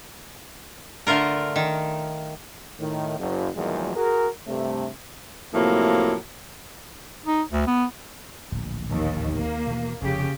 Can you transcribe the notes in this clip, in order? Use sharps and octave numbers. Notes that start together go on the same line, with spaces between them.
D3 A3 F4 A#4
D#3
A2 D#3
F#1
E2 A#2 D#3 F3 F#3 G#3
F#4 G#4 A#4
G2 C3 A3
A2 C3 F3 F#3 A3 A#3
D#4
D2
B3
D1 A#1
D#2
A#3
B2 E3
F1 C#3 F3 G4